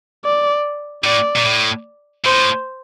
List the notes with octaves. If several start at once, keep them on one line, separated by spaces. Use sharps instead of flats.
D5
A2 D5
A#2
A2
A2 C5